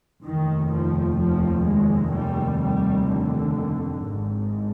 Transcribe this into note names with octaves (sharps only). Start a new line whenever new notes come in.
F1 D#2 D#3
F3
F3
G#3
G3
G3
D3
G#1 G#2